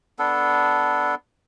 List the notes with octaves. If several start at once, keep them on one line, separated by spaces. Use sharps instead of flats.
B3 D4 A4